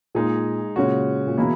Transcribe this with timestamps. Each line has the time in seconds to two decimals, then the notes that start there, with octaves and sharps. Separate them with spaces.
0.15 A#2 G#3 D#4 G#4
0.76 A#2 C#3 G#3 C#4 F#4
1.26 A#2
1.38 B2 E3 A#3 E4 G#4